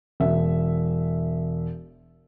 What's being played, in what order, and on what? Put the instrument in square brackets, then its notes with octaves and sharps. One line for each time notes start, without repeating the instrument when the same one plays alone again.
[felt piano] E1 E5